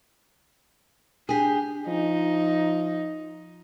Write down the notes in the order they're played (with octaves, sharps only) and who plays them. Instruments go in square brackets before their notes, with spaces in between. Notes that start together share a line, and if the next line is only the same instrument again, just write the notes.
[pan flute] D4 [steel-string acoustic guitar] G4 G#4
[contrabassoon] F3 [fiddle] D#4